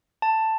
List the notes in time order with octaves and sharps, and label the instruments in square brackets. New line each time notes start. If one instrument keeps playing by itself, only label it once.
[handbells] A5